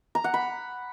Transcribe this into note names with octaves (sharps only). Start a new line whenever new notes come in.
A#5
F#5
B5